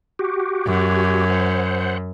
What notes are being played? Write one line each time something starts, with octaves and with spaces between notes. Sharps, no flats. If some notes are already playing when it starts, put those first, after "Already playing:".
F#4 G4
F#2
C5 F#5